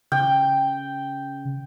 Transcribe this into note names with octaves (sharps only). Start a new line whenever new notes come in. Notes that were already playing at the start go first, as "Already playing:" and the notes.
C#3 G5